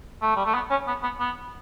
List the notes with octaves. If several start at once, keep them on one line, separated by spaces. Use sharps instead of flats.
A3
G3
A3
B3
C#4
B3
B3
B3